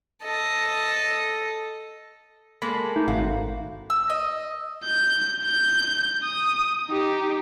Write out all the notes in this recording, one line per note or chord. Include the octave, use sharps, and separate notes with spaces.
A4 D#5
G#3 A#3 A4 B5
A3 D#4
G#1 F#4 F5
E6
D#5
G6
G6
D#6
D#4 G4